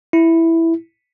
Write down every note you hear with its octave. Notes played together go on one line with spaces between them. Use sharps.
E4